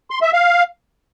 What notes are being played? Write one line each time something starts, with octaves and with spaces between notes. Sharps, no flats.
C6
E5
F5